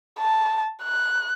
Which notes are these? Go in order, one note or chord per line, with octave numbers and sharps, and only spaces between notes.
A5
F#6